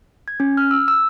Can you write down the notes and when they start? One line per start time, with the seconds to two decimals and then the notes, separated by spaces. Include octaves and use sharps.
0.28 G#6
0.40 C#4
0.57 F6
0.71 E6
0.88 E6